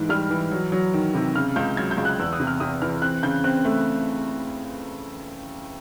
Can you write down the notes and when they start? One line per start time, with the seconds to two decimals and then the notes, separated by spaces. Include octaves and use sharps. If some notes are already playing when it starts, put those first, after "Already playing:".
Already playing: G#2 E3
0.09 G3 F6
0.31 E3
0.52 F#3
0.72 F#3
0.94 D#3
1.15 C3
1.35 C#3 F6
1.56 C#2 G6
1.77 F#3 G#6
1.91 G6
1.98 C#2
2.05 F#6
2.19 E2 E6
2.33 D#6
2.40 C3
2.47 F6
2.60 C3 D#6
2.82 E3 F6
3.02 C4 F#6
3.23 C#3 G6
3.44 C4 F#6
3.65 A3